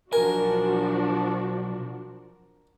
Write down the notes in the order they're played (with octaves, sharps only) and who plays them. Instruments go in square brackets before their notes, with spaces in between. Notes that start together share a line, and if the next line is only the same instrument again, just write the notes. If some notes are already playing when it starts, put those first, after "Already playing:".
[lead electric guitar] B1 G#5 [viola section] F3 D4 F#4 [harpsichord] A#4